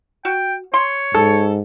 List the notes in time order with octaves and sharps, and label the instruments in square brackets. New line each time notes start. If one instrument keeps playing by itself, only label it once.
[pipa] F#4 [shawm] G5
[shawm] C#5 [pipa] C6
[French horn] G#2 [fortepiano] A4